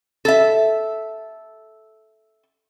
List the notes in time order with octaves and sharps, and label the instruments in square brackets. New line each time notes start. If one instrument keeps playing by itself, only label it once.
[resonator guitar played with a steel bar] A4 E5